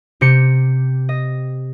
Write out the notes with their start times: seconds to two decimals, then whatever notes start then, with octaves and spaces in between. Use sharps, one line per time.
0.21 C3 G4 C#7
1.09 D#5